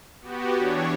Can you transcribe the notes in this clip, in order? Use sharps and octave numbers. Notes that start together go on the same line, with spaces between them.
B3 F#4 G4
E3 D4 C#5